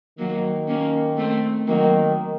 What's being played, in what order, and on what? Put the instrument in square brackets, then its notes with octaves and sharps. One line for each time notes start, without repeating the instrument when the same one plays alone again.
[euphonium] D#3 [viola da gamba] F#3 A#3
[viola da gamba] A#3 C#4
A3 C4
[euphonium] D#3 [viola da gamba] F#3 A#3